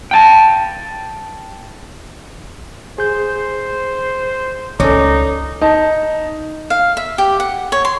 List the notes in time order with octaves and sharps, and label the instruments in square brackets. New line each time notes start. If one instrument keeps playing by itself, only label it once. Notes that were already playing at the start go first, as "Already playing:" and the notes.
[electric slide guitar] G5 A5
[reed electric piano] G#4 G6 [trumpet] C5
[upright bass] C#2 [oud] C#4 [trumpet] D#4 [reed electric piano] A4 D6
[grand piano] D#4 A5
[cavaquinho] F5
E5
G4
F#5
C#5
C6